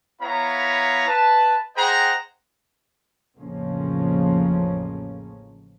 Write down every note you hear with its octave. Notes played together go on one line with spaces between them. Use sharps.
B3 E4 C#5 F5 A#5
B4 A5
G#4 C5 D#5 F#5 G5 A#5
A1 F2 C#3 F3 A#3 C#4